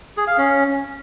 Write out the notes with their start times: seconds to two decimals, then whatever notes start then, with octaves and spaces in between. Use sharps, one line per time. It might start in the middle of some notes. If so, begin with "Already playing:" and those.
0.17 G#4
0.27 F5
0.38 C#4